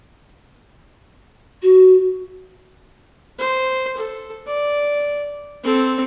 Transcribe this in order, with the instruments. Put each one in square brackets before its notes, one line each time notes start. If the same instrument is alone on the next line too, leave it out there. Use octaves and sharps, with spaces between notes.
[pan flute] F#4
[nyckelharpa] C5
A4
D5
C4 A4